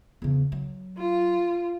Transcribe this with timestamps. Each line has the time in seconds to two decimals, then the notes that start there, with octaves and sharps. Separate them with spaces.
0.22 E2 C#3
0.52 F#3
0.98 F4